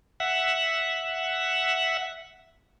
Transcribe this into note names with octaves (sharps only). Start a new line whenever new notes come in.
E5 F#5